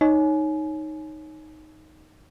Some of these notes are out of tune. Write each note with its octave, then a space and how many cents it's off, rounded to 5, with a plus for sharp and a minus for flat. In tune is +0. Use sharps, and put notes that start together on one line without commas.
D#4 +0 C#5 +0 G#5 +30